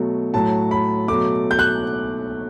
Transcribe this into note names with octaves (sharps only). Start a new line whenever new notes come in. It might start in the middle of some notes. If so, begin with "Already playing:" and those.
Already playing: B2 F#3 A3
A2 F#3 A3 A5
B5
B2 F#3 A3 D6
G6
F#6